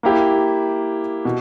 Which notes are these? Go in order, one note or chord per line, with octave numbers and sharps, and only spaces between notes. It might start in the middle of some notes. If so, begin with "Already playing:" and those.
A#3 E4 G4
B2